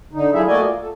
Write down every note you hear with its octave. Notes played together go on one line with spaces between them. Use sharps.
D3 D#4
F#3 E4 F4 G#4 A4 E5
A3 A#3 F#4 D5 D#5 G#5
F4
A4